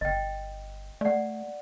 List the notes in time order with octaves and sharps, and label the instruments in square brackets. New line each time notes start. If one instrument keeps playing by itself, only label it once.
[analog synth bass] G1 [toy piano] D#5 G5
[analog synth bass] A3 [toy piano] D5 F#5